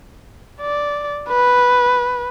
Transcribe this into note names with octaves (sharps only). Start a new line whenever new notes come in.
D5
B4